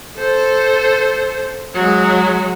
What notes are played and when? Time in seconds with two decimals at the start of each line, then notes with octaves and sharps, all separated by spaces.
0.18 A4 C5
1.74 F#3 G#3